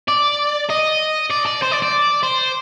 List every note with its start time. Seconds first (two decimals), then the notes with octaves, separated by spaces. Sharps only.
0.08 D5
0.70 D#5
1.30 D5
1.46 D5
1.62 C5
1.72 D5
1.82 D5
2.23 C5